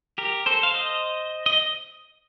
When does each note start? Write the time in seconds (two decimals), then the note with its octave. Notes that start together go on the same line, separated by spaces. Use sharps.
0.18 G4 A#4
0.46 A4 C5
0.63 F5
0.74 C5 D#5
1.46 D#5